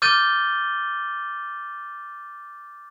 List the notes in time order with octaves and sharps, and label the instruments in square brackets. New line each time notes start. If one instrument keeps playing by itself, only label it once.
[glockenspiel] D6 F6 G6 A6 D#7 G7